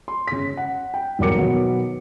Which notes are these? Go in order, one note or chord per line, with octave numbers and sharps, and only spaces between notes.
C6
C#3 B6
F#5
G5
D#1 E2 F#3 A#4 D6 C#7
B2 D#3 F#3 B3